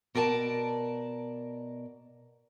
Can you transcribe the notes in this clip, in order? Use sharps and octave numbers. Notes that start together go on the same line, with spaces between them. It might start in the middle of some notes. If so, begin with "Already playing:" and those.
B2 A#4 D5 G#5 A5